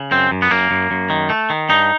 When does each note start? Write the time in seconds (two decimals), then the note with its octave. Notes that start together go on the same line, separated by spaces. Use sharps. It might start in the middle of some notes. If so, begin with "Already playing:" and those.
Already playing: C#3
0.11 F#2 C4
0.31 F#2
0.42 B3
0.51 F#2 A#3
0.71 F#2
0.91 F#2
1.10 D#3
1.30 A3
1.50 D#3
1.69 G2 D#4